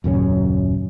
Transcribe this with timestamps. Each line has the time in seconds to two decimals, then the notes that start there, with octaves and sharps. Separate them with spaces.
0.04 D#1 F#2 C#3 C#4